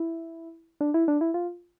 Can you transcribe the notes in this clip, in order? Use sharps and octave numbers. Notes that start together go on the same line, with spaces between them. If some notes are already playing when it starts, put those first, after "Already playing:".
Already playing: E4
D4
E4
D4
E4
F4